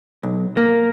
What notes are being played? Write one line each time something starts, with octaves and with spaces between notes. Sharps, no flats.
B1
A#3